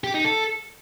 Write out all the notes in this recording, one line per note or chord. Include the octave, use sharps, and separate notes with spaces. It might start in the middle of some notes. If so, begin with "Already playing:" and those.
G4
D#4
A4